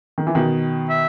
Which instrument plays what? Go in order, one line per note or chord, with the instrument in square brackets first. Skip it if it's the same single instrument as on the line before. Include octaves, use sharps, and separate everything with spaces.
[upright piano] D#3
E3
B2 D#3
[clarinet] E5